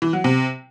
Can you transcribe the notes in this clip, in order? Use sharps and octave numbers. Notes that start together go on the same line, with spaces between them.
E3
F#3
C3